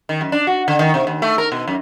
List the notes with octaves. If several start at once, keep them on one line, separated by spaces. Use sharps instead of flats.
D#3
F#2
D4
F#4
D3
D#3
C3
D#2
A3
A#4
B2
F#2